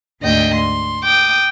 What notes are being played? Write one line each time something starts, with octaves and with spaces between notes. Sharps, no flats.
D2 G#2 D#5 G5
C6
G5 D6 D#6